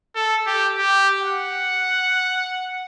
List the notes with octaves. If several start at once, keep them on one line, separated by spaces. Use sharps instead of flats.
A4
G4
G4
F#5